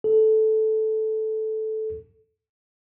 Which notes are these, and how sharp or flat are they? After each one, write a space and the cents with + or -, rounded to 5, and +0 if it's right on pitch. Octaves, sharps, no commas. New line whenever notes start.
A4 -10